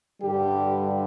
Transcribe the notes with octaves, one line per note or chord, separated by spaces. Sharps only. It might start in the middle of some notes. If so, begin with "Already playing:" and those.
G2 D3 G3 G4